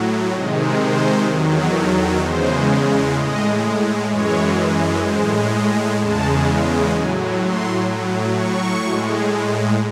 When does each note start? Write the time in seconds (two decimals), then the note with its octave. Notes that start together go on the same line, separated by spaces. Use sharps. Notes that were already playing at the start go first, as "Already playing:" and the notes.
Already playing: A2 F#3
0.32 C3 D#3 G#3 D#5
0.80 C5
1.26 E2 D#3 F#3
1.74 A4
2.20 E2 C#3 G#3 C5
3.15 A2 G#3 D#5
4.09 F#2 E3 G#3 C#5
5.03 A2 G#3 C5
5.51 D#5
5.98 E2 C#3 G#3 A5
6.92 A2 F#3 G#5
7.39 C6
7.86 A2 F#3
8.33 C#6
8.80 A2 G#3